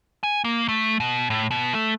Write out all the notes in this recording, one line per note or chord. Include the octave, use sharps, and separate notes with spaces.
G#5
A#3
A3
B2
A2
B2
A3